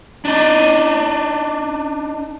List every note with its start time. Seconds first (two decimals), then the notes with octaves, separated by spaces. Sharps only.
0.25 D4 D#4